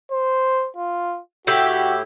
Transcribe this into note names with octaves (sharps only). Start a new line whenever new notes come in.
C5
F4
A2 E4 F#4 G4